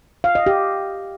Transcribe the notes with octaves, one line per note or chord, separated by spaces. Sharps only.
F5
D#5
G4